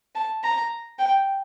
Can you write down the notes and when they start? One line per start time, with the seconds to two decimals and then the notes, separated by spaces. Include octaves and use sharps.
0.15 A5
0.44 A#5
0.99 G5